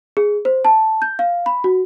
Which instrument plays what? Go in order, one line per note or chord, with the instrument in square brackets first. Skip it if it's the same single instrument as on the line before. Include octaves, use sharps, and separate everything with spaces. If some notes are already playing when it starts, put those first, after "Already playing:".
[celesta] G#4
C5
A5
G6
F5
B5
F#4